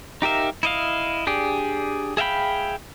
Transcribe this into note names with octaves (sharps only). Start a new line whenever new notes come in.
D#4 G4 A#4 E5 F5
E4 D#5 F5
D4 G4 G#4 D5
G#4 E5 F5 G5 B5